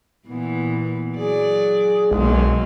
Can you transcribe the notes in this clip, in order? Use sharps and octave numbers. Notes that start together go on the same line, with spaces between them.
A#2 E3 B3
F#3 G#4 D5
B1 F#3 G#3 A#3